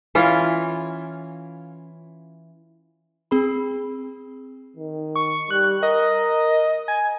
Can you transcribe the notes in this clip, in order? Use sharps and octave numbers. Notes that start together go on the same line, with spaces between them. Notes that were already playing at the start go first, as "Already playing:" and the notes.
E3 C#4 F4
C4 G#4 B5
D#3
C#6
G3 F#6
A#4 D#5
G#5